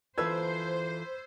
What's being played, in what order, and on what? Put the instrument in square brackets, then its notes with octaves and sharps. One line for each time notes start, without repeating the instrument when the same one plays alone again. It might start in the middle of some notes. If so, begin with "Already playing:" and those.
[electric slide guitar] E3 F4 A4 [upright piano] B4 E6 G#6 [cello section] C5